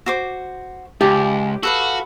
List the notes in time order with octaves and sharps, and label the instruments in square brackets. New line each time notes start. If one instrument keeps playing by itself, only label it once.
[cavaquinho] F#4 C5 D6
[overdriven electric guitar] C#2 [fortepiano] G4 [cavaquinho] A5
[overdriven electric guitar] F#4 [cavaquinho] A4 B4 F5